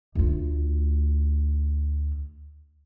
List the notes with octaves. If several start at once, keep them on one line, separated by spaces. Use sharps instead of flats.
D2 F4